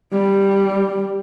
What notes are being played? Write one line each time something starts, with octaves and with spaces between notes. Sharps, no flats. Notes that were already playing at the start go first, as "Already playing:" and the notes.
G3